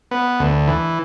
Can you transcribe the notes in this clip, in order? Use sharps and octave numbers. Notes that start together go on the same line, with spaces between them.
B3
D2
E3